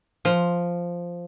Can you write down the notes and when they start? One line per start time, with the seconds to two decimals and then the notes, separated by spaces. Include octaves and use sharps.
0.25 F3